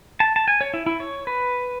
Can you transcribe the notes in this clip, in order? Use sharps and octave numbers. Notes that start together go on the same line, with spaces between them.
A5
A5
G#5
C#5
E4
E4
C#5
B4